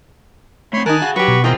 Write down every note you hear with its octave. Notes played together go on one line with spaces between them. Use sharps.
A3 C4 C#5 B5 C6
D#3 D#4 A#4 G#5 A5 F#6
F#4 G#4 F5
F#3 F#4 G4 B4 C#6
B2
E3 G#3 C4 F4 A#4 D#5 G5